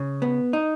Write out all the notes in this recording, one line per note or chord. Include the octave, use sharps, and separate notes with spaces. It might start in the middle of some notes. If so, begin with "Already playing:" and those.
Already playing: C#3
B3
D#4